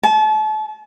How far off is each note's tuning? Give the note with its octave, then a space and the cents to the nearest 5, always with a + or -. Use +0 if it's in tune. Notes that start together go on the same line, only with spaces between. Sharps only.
A5 -35